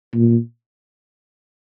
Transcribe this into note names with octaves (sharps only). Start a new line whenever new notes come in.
A#2